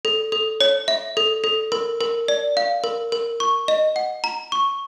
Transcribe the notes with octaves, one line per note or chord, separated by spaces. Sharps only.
A4
A4
C#5
E5
A4
A4
A#4
A#4
D5
F5
A#4
A#4
C#6
D#5
F#5
A#5
C#6